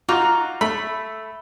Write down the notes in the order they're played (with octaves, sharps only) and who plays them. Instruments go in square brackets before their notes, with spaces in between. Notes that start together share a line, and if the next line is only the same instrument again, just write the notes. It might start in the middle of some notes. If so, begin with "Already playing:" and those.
[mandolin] D#4 [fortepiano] F4 F#4 D6
[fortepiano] A3 [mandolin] B5